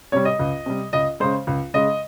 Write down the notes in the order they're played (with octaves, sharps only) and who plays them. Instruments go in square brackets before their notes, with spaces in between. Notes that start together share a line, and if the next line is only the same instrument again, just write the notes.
[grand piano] C3 G3 C#5
D#5
C#2
C3 G3
C#2 D#5
C#3 G#3 C5
C#2
C#3 G#3 D#5